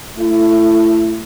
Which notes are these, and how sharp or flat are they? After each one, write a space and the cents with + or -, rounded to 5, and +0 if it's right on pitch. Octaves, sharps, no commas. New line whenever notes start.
A3 +0 E4 +25